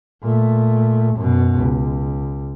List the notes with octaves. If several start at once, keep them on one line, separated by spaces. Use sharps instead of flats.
A#2 A3
F#2 B2
C#2